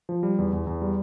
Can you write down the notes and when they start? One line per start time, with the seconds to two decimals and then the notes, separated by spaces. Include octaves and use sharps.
0.09 F3
0.23 G3
0.38 E2
0.53 E2
0.67 E2
0.82 G3